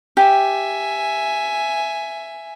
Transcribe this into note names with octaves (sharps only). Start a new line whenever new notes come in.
G4 E5 G#5